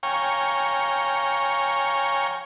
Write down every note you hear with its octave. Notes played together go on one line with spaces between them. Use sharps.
C#5 F5 G5 G#5 A#5 C#6